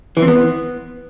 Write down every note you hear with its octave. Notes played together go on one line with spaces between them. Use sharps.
E3
C4
B3